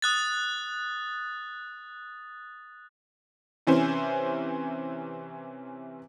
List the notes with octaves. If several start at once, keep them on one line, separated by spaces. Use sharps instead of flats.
D#6 F#6 A6
C3 E3 C#4 E4 C5 G#5